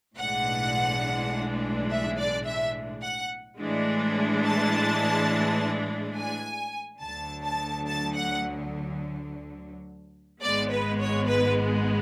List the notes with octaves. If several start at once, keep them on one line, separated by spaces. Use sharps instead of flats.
B1 A2 E3 G#3 D4 F#5
E5
D5
E5
F#5
A2 E3 G#3 D4
A5
G#5
D2 D3 F#3 A5
A5
A5
F#5
G#1 G#2 G#3 B3 D5
B4
C#5
B4